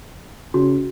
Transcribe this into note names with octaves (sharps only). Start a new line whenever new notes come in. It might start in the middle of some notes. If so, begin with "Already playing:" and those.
C#3 F#4